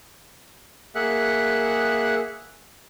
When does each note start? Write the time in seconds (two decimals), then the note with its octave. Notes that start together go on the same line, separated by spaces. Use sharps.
0.95 A#3 G#4 E5 F#5 F#6